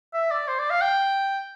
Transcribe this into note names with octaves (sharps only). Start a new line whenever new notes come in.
E5
D5
C5
D5
F5
G5